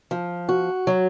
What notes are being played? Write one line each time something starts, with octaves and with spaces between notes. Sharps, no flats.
F3
F#4
F#3